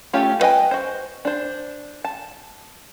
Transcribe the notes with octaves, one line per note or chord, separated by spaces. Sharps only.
A3 C#4 F4 G4 C#5
B3 B4 D#5 G5 G#5
F#4 C5
D4 C5
A5